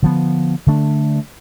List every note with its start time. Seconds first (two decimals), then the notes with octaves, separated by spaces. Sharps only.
0.02 D3 F3 B3
0.67 D3 A3 D4